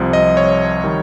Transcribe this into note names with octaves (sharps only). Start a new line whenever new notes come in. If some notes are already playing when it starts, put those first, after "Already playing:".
Already playing: C2 C3 F3
D#5
C#5
D#3 G3